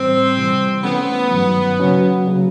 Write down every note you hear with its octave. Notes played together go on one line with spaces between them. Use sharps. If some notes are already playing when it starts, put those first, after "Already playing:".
Already playing: A2 E3 G3 C4
C3 E3 G3
E3 A3 B3 C#4
G2 D#3 F#3
C#3 F#3 A#3 C#4 F#4
C#3 F#3